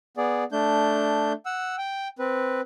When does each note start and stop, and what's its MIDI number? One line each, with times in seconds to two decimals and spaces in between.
0.17 0.44 59
0.17 0.44 68
0.17 0.44 74
0.52 1.33 57
0.52 1.33 62
0.52 1.33 91
1.46 1.76 78
1.46 1.76 88
1.78 2.08 79
2.19 2.61 60
2.19 2.61 71